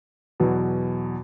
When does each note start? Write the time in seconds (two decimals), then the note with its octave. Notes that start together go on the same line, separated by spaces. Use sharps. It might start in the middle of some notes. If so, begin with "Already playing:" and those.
0.40 E2 B2 F#3